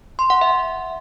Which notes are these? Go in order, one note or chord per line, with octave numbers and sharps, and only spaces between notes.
C6
F#5
E5